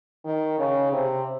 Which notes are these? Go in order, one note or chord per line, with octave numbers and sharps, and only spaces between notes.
D#3
C#3
C3